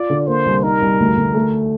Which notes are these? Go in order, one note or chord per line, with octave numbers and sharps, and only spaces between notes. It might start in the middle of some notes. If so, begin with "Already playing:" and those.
Already playing: F4 D5
D3
A#3 C5
C2
D#4 A#4
C2
D2
D2
A3